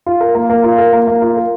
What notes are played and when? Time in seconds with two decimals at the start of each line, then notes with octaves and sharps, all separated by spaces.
0.06 F4
0.21 A#4
0.35 A#3
0.50 A#3
0.64 F4
0.78 A#4
0.93 A#3
1.08 A#3
1.22 F4
1.37 A#4